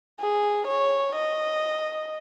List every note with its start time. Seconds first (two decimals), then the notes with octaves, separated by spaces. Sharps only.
0.20 G#4
0.67 C#5
1.16 D#5